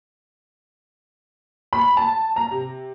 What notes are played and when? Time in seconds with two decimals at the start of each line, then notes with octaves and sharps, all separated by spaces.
1.73 B5
1.97 A5
2.36 A#5
2.51 C3